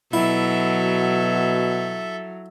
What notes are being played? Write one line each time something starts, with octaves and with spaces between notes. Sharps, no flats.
B2 F#3 E4 A4 E5